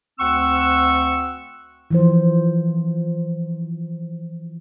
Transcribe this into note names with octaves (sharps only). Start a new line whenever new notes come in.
D2 C4 F#5 C#6 E6
E3 F3 C5